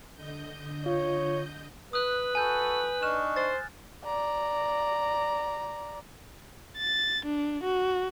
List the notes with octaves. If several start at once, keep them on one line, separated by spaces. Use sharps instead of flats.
D3 D#5 G6
F4 C#5
B4 D#6 F#6
F#4 A4 G#5 B5 G6
D4 D#4 C#6 F6 F#6 E7
C5 A6
D5 A#5
A6
D4
F#4